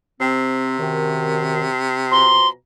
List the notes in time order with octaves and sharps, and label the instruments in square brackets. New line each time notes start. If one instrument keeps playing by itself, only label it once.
[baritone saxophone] C3 [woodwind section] C4
[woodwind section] F#2 D#3
[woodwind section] B2 F3 A#5 [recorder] C6